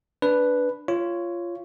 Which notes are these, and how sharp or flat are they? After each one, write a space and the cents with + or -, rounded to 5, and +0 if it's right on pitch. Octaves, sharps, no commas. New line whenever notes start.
D4 -10 B4 +0
F4 -15 C#5 +0